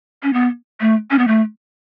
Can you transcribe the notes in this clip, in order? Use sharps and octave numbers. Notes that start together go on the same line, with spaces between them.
C#4
B3
A3
C#4
B3
A3